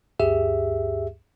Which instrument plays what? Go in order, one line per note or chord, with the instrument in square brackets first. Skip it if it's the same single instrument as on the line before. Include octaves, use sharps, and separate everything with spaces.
[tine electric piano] D2 G2 G4 G#4 E5